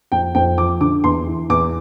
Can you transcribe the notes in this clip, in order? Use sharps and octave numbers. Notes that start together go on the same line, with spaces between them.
F2 G5
F2 G5
F3 D6
D3 D6
E2 C6
E3
E2 D6